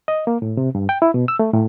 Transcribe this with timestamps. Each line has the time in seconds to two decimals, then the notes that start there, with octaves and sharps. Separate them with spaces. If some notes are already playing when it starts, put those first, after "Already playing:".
0.08 D#5
0.27 A#3
0.42 A2
0.57 C3
0.75 G2
0.89 G5
1.02 E4
1.14 B2
1.28 E6
1.39 A3
1.53 A2